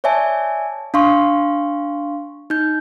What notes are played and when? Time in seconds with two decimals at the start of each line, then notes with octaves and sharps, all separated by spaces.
0.04 C#5 D5 E5 G#5 A5
0.94 D4 F5 C6 C#6
2.50 D#4 G6